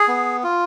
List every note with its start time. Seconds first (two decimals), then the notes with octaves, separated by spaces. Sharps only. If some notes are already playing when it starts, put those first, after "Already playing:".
Already playing: G#4
0.08 B3
0.43 F4